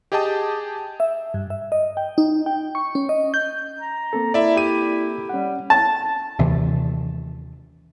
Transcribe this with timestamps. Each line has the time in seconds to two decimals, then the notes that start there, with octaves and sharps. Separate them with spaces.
0.12 G4 G#4 D#5 G5 A5 D#6
1.00 E5
1.34 G2
1.50 E5
1.72 D#5
1.97 G5
2.18 D#4
2.46 G5
2.75 C#6
2.95 C#4
3.09 D#5
3.34 G6
3.79 A#5
4.13 A#3 C4 A4
4.34 E4 D5 E5
4.56 G4 D#7
5.29 G3 C#4 F#5
5.70 A5
6.39 D#2 C3 E3